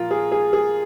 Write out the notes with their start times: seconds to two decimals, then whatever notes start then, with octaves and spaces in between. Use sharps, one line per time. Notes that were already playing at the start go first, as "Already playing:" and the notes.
Already playing: A#2 F3 F4 A#4
0.11 G#4
0.32 G#4
0.53 G#4